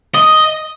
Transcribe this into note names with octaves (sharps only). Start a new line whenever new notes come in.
D#5